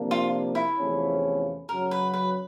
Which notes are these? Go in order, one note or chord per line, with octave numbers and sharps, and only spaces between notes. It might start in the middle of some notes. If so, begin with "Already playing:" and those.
Already playing: C3 F3 A#3 D4
F4
E4
E2 C3 F3 A3 C#4
F#2 C#3 F#3 A#4
B4
B4